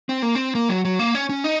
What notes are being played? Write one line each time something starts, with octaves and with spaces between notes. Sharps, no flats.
C4
A#3
C4
A#3
F#3
F#3
A#3
C#4
C#4
D#4